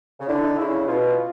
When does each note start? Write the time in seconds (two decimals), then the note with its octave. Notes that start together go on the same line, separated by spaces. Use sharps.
0.20 C#3
0.27 D3 E4
0.43 D#4
0.57 C#3 E4
0.87 B2 F4